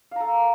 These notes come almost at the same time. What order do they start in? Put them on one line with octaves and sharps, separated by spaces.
F5 A#5 A4